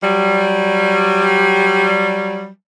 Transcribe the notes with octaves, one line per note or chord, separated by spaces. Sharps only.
F#3 G3